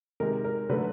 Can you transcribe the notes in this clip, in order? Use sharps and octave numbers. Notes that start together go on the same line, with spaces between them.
C3 D#3 G#3 A#4
A#4
D3 F#3 A3 B4